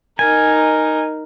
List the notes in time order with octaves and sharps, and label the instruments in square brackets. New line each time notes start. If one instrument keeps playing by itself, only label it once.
[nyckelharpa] D#4 A#4 [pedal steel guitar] G#5